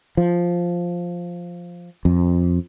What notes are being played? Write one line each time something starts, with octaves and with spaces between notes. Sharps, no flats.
F3
F2